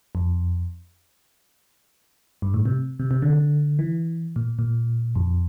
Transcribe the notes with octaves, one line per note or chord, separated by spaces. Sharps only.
F2
G2
A2
C3
C3
C3
D3
D3
E3
A#2
A#2
F2